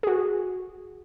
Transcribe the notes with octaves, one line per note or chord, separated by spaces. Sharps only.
F#4 G#4